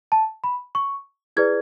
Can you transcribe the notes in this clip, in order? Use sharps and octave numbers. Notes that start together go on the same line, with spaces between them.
A5
B5
C#6
E4 G#4 B4 D5 G#6